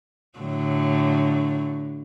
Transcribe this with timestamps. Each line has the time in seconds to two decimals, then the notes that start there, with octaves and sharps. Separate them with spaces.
0.39 A2 D3 F#3